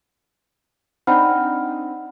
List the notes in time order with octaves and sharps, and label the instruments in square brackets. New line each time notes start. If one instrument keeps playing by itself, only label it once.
[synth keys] C4 D4 D#4 [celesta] F#5 B5 F6